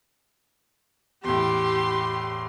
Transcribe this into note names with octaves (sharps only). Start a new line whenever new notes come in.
E2 A2 G4 C6